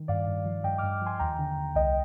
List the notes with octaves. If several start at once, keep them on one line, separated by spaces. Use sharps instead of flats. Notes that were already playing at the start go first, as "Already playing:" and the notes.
Already playing: D#3
G2 D5 F5
G2
F3
G2 D#5 G5
G2 D6 F6
F3 G#5 C6
D#2 G5 A#5
D3
D#2
C2 D#5 G5